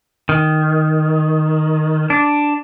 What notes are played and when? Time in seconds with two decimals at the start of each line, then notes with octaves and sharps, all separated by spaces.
0.29 D#3
2.10 D4